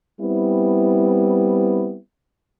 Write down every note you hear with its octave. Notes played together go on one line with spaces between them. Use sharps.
G3 B3 C4 E4